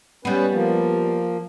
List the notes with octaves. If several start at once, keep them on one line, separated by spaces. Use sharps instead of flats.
G3 B3 C#4 B4
F3 A#3